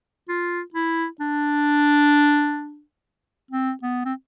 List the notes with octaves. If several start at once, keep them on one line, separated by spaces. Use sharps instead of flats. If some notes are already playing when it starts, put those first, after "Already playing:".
F4
E4
D4
C4
B3
C4